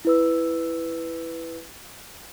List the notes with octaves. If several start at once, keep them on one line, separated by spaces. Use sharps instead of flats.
E4 B4 E6